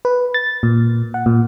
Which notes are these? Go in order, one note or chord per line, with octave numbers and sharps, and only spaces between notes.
B4
A6
A#2
F#5
A#2